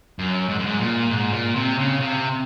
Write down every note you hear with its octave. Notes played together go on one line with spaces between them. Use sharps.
F#2
G#2
F#2
G#2
A#2
G#2
A#2
C3
C#3
C3